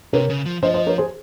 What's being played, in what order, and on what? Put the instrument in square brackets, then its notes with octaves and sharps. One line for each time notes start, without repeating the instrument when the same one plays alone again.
[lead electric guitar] C3 [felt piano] A#4 C#5
[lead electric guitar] C#3
F3
[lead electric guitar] F3 [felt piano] C5 D#5
[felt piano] C5 D#5
A#4 C#5
G#4 C5